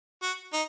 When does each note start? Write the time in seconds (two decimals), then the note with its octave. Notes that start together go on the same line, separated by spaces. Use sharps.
0.22 F#4
0.53 D#4